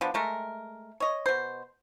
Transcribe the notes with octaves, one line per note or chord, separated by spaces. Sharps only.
F3 B3 D4
G#3 A3 A#4
C#5 D#5
B2 C5